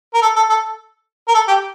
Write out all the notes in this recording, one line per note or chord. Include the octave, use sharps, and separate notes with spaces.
A#4
A4
A4
A4
A#4
A4
G4